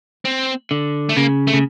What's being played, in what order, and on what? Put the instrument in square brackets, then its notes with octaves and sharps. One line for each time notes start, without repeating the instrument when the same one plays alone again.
[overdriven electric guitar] C4
[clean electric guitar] D3
[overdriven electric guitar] A3
[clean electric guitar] C#3 [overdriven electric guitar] A#3
[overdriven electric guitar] A3
[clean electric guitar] C#3